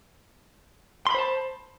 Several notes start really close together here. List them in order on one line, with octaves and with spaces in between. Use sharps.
C6 B5 C5 A5